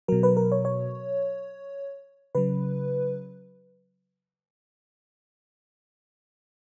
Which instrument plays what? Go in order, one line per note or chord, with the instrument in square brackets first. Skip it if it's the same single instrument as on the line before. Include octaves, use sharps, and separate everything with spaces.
[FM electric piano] B2 F#3 A#4
B4
A#4
C#5
C#5
C#3 F#3 B4